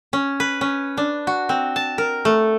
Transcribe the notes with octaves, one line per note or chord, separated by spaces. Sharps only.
C#4
B4
C#4
D4
F#4
C4
A5
A#4
A3